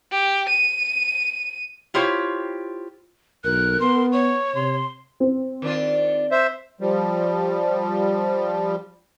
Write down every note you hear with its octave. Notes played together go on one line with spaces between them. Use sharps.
G4
D#7
E4 F4 G4 C5 C#5
B1 A#4 F#6
B3 C6
C#5 C#6
C3 C6
C4
D#3 D4 F4
C5 E5
F3 G3